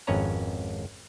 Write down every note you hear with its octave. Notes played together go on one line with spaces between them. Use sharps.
G#1 F2 C#4 B4 C#5 A#5